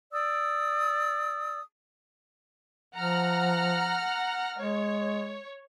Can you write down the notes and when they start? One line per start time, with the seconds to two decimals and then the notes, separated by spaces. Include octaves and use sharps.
0.12 D5 D#6 E6
2.96 F3 F#5 A#5 F6
4.59 G#3 C#5